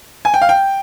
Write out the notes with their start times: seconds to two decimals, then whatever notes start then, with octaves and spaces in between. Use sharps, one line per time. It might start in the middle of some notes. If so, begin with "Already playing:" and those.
0.25 G#5
0.34 G5
0.41 F5
0.49 G5